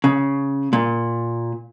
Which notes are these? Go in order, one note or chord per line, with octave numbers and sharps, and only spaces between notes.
C#3
A#2